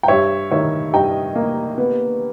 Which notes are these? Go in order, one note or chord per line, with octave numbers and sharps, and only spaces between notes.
G5
G2 C#5 E5
D#3 C#5 E5
G2 D#5 G5
A#3
B3